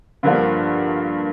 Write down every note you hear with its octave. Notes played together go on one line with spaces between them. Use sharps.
G2 D3 F3 A#3